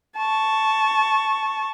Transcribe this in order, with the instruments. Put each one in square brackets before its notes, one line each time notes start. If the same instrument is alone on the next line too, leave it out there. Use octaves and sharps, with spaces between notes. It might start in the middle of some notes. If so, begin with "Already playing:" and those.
[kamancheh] A5 C#6